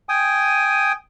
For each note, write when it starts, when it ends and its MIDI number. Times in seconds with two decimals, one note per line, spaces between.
0.09 0.92 79
0.09 0.92 80
0.09 0.92 87